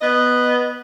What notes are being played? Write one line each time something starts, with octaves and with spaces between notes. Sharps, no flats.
B3 D#5